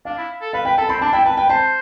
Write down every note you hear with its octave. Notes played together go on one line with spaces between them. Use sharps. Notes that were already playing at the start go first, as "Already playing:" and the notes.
D4 F5
E4
A4
B4 F5
B4 G5
A4 A5
C4 B5
D4 A5
E4 G5
B4 A5
B4 G5
C5 A5